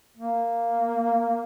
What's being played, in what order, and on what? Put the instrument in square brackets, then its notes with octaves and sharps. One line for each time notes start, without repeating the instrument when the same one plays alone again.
[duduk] A#3